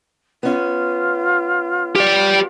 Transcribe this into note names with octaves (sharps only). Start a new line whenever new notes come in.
B3 C#4 F4
G4 D5